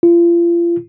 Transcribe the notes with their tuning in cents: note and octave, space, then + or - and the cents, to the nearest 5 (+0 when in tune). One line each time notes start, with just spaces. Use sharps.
F4 -35